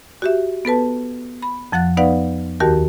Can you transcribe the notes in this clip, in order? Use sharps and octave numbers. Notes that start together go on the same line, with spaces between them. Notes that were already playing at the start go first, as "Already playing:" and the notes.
F#4 G4 E5
B3 A4 B4 A5
B5
F2 F3 F#5 F#6 A6
B3 D#4 B4 D5 F5 F#5
D#2 D#3 F#4 G4 A#4 A5